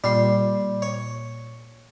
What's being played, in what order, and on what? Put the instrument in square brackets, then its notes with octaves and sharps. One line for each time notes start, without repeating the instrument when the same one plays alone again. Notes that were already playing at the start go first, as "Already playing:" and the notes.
[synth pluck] A#2 [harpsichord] G3 C6
[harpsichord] C#5